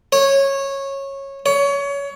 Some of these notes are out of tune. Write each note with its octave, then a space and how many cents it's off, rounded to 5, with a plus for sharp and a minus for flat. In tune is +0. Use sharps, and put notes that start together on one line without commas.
C#5 -15
C#5 +25